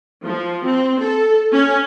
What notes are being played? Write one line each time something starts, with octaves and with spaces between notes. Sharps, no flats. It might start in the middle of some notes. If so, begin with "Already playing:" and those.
F3
C4
A4
C#4